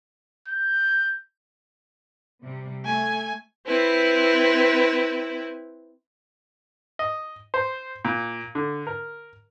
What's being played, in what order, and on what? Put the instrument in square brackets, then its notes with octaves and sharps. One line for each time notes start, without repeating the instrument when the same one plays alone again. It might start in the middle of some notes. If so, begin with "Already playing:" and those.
[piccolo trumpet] G6
[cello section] C3 G3
[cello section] A3 [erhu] G#5
[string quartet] C4 E4 B4
[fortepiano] D#5
C5
A#2
D3
A#4